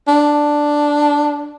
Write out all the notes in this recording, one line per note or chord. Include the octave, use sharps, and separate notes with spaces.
D4